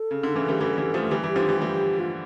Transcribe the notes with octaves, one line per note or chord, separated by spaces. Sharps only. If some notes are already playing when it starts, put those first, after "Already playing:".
Already playing: A4
C#3
D3
C#3 E3
E3 G3
E3 G3
E3 G3
F3 A3
E3 G3 G4
E3 G3
D3 F3
E3 G3
E3 G3
F4